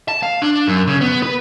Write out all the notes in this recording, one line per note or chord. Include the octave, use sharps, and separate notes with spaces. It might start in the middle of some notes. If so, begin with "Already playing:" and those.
A5
F5
D4
F#2
C#3
B3
B4